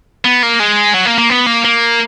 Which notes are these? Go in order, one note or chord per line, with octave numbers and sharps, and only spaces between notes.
B3
A#3
G#3
F#3
A#3
A#3
B3
A#3
A#3